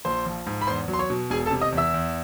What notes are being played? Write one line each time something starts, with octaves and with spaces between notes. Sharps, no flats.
A#1 C5 C6
F3
G#2
B5
E2 C5 C6
F#3
C6
C#5 C#6
B2
E1 G#4 G#5
A4 A5
C3
D#5 D#6
E2
E5 E6
E2